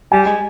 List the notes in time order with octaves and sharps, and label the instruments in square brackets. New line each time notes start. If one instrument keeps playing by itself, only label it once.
[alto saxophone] G3 [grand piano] G#5
[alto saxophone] G#3